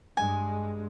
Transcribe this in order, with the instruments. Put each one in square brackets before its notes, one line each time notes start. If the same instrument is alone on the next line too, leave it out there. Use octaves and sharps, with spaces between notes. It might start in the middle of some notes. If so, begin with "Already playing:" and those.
[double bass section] G2 G#3 [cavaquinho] G#5